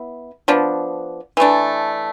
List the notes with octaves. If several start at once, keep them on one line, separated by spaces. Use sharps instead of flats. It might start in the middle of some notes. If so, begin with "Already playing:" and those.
Already playing: B3 E4
F3 B3 D4
E3 A3 D4